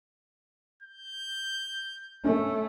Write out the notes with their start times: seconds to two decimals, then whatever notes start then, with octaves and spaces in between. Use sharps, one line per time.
0.83 G6
2.24 A3 C#4